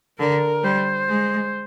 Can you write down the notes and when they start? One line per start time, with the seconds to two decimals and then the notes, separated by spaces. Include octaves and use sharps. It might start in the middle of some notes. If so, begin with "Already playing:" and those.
0.19 D3 A#4
0.64 G3 C5
1.09 G#3